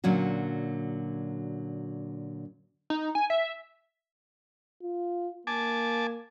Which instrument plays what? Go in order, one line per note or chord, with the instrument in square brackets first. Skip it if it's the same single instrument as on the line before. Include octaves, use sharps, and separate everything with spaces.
[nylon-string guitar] A#2 D3 F#3 C#4 F#4
[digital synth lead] D#4
G#5
E5
[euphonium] F4
[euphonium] A#3 [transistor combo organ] G#5 A5 D6